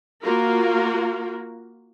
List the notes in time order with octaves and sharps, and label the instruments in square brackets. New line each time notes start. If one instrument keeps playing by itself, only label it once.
[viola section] A#3 F4 F#4 A#4